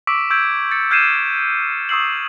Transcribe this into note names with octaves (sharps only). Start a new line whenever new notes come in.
C#6 D6 E6 B6 D7
C#6 E6 G6 G#6 D7
A6 C#7
F6 G6 G#6 C7 D#7 E7
C#6 D#6 E6 C7 F#7